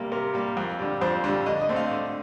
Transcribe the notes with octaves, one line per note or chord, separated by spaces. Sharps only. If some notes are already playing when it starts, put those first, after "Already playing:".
Already playing: C3 G3 A#3 G4
C3 A#4
G3 A#3
F2
D3 G3
F2 C5
D3 G3
D3 D#5
D#5
A3 C4
F5
D3